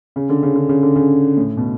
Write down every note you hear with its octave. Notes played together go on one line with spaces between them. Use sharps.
C#3
D3
C#3
D3
C#3
D3
C#3
A2
B2